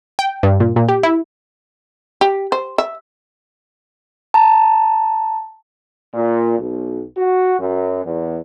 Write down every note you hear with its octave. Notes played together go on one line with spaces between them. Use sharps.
G5
G2
A#2
A#2
G4
E4
G4
C5
E5
A5 A#5
A#2
B1
F#4
F#2
E2